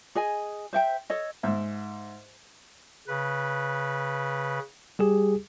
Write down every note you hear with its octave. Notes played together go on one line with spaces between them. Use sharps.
G#4 D#5 G#5
C5 E5 G5
A4 C#5 D#5
G#2 E5
C#3 B4
G3 G4 G#4